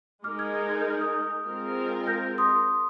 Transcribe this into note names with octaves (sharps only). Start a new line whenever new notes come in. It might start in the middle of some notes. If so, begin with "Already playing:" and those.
G#3 D#4 A#4 D6 F6
F6 G#6
F6 G#6
G#6
G6
F6
D#6 G6
G#3 C4 F4 A#4
G6 A#6
C6 D#6